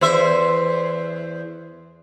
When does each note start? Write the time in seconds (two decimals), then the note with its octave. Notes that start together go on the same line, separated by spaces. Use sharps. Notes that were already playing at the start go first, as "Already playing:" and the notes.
0.01 E2 C5 E5